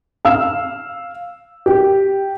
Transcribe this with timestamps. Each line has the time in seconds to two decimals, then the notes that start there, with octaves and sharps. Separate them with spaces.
0.25 F5 E6
1.66 G4